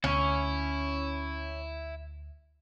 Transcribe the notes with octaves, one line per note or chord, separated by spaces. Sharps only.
D2 C#4 E4